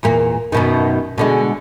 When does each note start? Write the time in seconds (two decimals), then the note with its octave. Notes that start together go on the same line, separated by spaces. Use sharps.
0.03 E2 A#2 A#3
0.52 F#2 B2 D#3
1.18 B2 D3 G#3